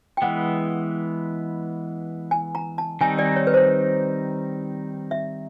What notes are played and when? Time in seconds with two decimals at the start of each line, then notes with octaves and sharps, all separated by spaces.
0.17 G5
0.22 E3 G#3 B3 F#5
2.31 G#5
2.55 A#5
2.78 A5
3.01 D#3 G3 C4 D#4 G#5
3.19 D5
3.36 C#5
3.47 B4
3.54 C5
5.11 E5